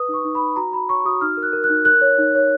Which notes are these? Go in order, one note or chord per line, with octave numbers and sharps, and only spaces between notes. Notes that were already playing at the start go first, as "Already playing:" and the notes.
Already playing: B4 D#6
D#4 C#6
D#4
B5
D#4
F#4 A#5
F#4 B5
C#5 C#6
F#4 D#6
D#4 F6
A#4
F#6
A#4
F#6
D#4
A#4 F#6
C#5
D#4
C#5